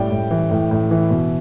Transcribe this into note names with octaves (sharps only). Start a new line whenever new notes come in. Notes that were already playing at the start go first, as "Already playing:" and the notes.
Already playing: A2 G3 D5 G5
A2
E3
A2
A2
E3
B2